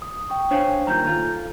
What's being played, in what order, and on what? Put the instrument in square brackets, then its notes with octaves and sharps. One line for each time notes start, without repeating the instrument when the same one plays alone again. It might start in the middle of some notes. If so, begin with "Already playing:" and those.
[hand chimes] D#6
G5 C#6
[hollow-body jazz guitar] D4 C#5 F5 [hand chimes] C5 G#5
[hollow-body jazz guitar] A#2 D#3 G3 [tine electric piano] A#5 G6
[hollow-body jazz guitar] F4 [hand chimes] A4